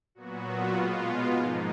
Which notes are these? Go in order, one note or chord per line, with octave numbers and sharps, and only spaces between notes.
A#2 F#3 B3 F#4
F4
B2 G#3 B3
G#2 F3 A#3 D#4